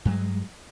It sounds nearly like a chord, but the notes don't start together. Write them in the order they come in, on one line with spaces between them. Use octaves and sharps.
G2 F#3 G#3